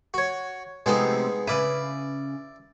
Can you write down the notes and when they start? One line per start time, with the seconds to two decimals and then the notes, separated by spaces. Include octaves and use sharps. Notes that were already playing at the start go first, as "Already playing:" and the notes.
0.14 F#4 C#5
0.86 C3 F3 G#3 A3 B3 D#4
1.47 C#3 E4 B4 D5